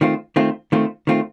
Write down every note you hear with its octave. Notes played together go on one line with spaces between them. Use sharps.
D#3 A3 C4 F4
D#3 A3 C4 F4
D#3 A3 C4 F4
D#3 A3 C4 F4